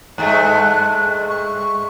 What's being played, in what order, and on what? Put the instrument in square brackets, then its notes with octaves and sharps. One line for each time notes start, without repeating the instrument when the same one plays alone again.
[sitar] G2 G#3 A3 [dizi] F#6
[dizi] C#6